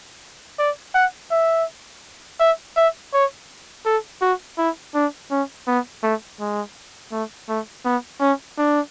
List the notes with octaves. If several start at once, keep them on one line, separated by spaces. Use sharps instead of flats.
D5
F#5
E5
E5
E5
C#5
A4
F#4
E4
D4
C#4
B3
A3
G#3
A3
A3
B3
C#4
D4